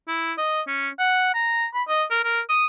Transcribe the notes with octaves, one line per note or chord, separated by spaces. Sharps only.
E4
D#5
C#4
F#5
A#5
B5
D#5
A#4
A#4
D#6